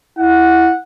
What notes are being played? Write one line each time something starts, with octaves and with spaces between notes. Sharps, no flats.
E4 F#5